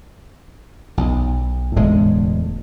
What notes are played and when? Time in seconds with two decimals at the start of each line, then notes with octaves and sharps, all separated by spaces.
0.97 B1
1.76 E1 D2 A2 G#3